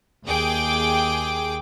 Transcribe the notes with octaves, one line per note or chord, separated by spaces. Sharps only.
D#2 G#4 G5 D6